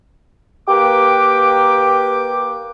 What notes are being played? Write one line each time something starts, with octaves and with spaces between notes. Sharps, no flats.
A#3 G4 B4 G5 D6